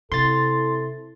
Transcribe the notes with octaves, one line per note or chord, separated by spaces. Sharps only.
C3 E4 A4 C6 A6